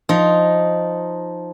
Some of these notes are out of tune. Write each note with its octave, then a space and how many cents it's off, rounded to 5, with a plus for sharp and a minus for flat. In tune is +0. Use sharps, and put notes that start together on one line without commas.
F3 +0 D#4 +0